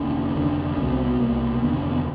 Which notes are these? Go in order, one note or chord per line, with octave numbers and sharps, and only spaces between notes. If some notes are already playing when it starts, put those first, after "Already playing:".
Already playing: F1 D#2 D3 C#4
F1 D#2 D3
C2 B2 C#4
C4
B3
C2 B2 A#3
F1 D#2 D3 B3
C#4
B3